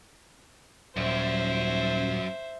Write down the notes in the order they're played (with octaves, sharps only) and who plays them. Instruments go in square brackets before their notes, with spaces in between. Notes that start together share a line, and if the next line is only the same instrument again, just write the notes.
[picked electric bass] D#1 [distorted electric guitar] F#2 [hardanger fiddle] C5 E5